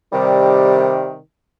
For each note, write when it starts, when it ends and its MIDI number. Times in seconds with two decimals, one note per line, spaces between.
0.13 1.17 48
0.13 1.17 51
0.13 1.17 55